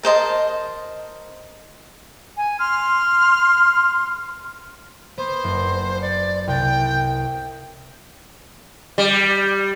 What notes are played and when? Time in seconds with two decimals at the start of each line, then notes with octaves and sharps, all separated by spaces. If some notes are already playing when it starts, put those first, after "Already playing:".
0.03 A#4 C5 D#5 A5
2.37 G#5
2.59 C6 F6
5.18 B3 C5
5.44 F#1
6.02 D5 C#7
6.47 C2 G5
8.98 G3